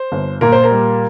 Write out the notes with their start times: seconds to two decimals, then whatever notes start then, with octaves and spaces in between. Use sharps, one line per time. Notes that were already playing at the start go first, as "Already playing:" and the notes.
Already playing: C5
0.12 G1
0.41 A#2 A#4
0.52 C5
0.64 A#4
0.71 G3